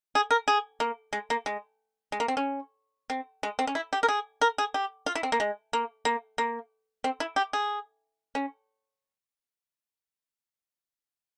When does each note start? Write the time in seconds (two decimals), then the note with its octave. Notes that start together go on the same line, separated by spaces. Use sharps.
0.15 G#4
0.31 A#4
0.48 G#4
0.80 A#3
1.13 G#3
1.30 A#3
1.46 G#3
2.12 G#3
2.20 A#3
2.28 C4
2.37 C#4
3.10 C4
3.43 G#3
3.59 C4
3.67 C#4
3.75 E4
3.93 G4
4.03 A#4
4.08 G#4
4.41 A#4
4.58 G#4
4.74 G4
5.06 F4
5.15 E4
5.23 C4
5.32 A#3
5.40 G#3
5.73 A#3
6.05 A#3
6.38 A#3
7.04 C4
7.20 E4
7.36 G4
7.53 G#4
8.35 C#4